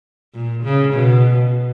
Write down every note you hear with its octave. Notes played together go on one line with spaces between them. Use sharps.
A#2
C#3
B2